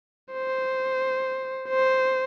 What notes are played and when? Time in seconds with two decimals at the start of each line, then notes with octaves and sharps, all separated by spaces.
0.33 C5
1.69 C5